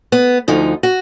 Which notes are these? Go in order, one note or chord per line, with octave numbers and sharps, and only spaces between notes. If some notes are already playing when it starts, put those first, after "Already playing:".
B3
D2 D3 F3 D#4
F#4